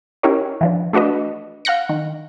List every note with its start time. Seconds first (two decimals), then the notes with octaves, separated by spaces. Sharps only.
0.23 C#4 D#4 E4 G4 A#4 C#5
0.61 E3 F3 D4
0.93 A3 D4 F#4 B4 D#5
1.65 F5 F#5 F#6 A#6 C#7
1.89 D#3